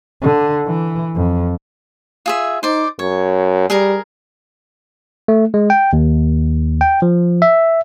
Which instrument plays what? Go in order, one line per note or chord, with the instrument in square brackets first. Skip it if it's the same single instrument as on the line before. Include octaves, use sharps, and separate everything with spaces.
[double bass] D3
E3
F2
[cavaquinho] F4 G#4 E5
[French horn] D#4 [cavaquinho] C5 D5
[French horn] F#2 [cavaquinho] C#5
[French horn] G3 [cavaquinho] G#4 A#4 A#5
[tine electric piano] A3
G#3
G5
D#2
G5
F3
E5